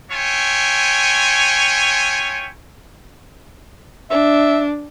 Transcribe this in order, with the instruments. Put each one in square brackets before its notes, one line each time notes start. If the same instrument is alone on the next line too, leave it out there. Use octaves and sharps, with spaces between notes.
[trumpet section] E4 F4 C#5 G5 G#5
[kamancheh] D4 [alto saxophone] E5